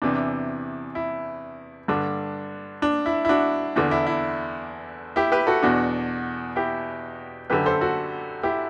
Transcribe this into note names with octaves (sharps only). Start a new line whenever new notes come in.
E2 C3 E3 D4
E4
G2 D3 D4
D4
E4
E4
D4 F#4
E2 D3 D4
E4
E4
E4 G4
G4 B4
F#4 A4
E2 B2 D4 F#4
E4 G4
F#2 D3 G4 B4
A4 C5
F#4 A4
E4 G4